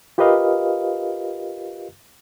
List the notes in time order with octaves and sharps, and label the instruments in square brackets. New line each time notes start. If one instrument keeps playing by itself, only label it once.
[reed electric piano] F4 G4 A#4 B4 D#5 F5